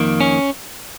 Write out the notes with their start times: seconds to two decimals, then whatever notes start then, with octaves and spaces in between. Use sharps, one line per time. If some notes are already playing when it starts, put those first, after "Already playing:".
Already playing: F2 D#3 A#3
0.21 C#4